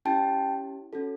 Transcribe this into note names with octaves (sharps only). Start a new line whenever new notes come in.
C#4 E4 G4 G5 A5
C#4 F#4 A4